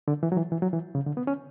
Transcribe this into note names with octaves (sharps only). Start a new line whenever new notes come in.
D3
E3
F#3
E3
E3
F#3
E3
C#3
D3
B3
C#4